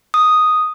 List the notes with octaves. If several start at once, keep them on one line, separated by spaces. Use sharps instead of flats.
D#6